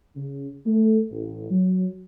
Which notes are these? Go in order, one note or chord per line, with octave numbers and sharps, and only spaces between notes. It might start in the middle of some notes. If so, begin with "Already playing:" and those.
C#3
A3
A1
F#3